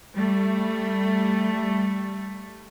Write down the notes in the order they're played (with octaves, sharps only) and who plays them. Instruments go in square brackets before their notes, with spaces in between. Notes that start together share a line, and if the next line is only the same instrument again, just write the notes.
[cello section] G3 A3